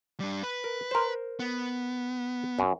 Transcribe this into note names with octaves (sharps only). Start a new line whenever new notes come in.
G3 D4
B4
A#4
A#4 C5
B3
F#2